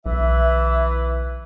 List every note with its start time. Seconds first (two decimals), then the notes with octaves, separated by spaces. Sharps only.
0.06 B1 E3 E5